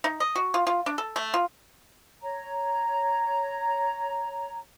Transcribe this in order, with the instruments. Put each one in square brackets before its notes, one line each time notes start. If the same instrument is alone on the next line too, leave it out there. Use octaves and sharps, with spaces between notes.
[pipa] D#4
D#5
F#4
F4
F4
D4
A4
A3
F4
[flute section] C#5 A#5